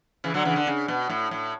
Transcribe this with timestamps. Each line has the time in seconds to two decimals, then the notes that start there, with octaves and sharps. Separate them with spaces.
0.24 C#3 E3
0.34 D3 F#3
0.45 C#3 E3
0.56 D3
0.67 C#3
0.88 B2
1.09 A2
1.31 A2